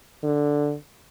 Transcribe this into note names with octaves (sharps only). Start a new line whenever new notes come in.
D3